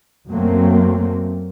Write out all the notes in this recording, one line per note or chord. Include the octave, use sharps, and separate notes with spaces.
F#2 F#3 A3 A#3 C4